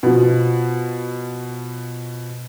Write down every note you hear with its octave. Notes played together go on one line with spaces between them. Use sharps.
B2 F3